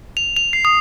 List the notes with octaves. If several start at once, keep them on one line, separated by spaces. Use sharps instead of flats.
F7
F7
C7
D#6